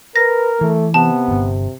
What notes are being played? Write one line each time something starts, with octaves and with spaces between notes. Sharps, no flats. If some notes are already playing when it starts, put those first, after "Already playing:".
A#4 B4 A#6
E3 A3
C3 B3 A5
D1 G1